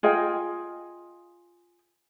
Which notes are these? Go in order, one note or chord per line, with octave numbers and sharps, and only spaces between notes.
F4 G#4 D#5 G5